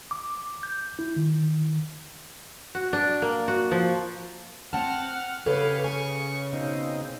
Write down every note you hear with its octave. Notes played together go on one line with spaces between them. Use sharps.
D6
G6
E4
D#3
F#4
D4
A#3
F#4
F3
C4 F#5 A5 F6
C#3 G4 A4 B4 C#5 F5
G#5 C#6
B2 C4 D#4